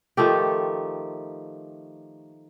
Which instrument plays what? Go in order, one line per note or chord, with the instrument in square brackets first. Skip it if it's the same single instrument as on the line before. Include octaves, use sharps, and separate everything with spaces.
[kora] D#3 F3 A3 G4